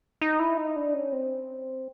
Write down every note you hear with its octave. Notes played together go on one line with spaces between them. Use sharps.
D#4
E4
D#4
D4
C#4
C4